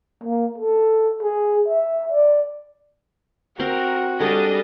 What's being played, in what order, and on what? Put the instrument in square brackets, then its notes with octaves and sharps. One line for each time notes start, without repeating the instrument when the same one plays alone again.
[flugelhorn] A#3
A4
G#4
E5
D5
[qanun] C4 C6 [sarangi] F#4 [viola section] A#4
[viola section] G3 D4 D#5 [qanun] G#4 [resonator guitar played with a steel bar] A4